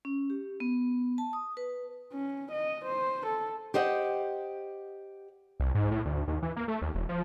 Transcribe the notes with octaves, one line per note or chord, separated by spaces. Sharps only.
C#4
G4
B3
A5
D#6
B4
C#4
D#5
C5
A4
G4 C5 D#5 F#5
C2
G#2
A2
D2
D#2
E3
A#3
A3
D#2
E1
F3